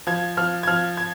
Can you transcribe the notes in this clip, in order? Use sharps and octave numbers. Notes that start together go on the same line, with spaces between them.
F3 G#6
F3 F6
G#6
F3 F6
G#6